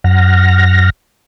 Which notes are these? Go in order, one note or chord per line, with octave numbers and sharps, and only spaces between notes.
F#2 F#5 F6 A#6